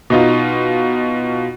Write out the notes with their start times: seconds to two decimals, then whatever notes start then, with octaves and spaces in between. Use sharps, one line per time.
0.10 B2 D#4 F4